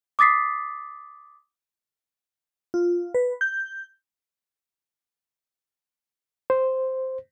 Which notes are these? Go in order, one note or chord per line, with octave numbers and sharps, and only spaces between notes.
D6 D#6 A6 B6 C7
F4
B4
G6
C5